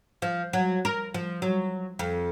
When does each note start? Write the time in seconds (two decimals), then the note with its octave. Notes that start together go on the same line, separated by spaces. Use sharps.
0.22 F3
0.53 F#3
0.85 A#4
1.14 F3
1.42 F#3
1.99 F2